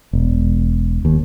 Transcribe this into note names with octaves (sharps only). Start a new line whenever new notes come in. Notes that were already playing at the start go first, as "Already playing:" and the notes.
E1
D#2